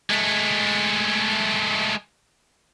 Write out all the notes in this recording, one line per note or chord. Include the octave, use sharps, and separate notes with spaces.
G#3 A3